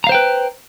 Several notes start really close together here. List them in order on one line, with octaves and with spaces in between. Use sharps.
A#5 F5 C5 G5 B4